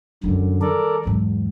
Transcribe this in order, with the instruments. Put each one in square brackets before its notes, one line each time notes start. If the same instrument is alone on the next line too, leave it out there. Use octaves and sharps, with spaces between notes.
[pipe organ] F#2 D3 [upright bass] D#3 G3
[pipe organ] A4 A#4 D5
[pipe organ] E2 [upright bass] G#2 F#3